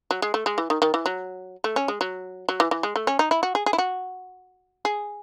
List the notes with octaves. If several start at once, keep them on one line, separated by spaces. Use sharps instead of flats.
F#3
G#3
A3
G#3
E3
D#3
D#3
E3
F#3
A3
C#4
G#3
F#3
F#3
E3
E3
G#3
A3
C#4
D#4
E4
F#4
G#4
G#4
E4
F#4
G#4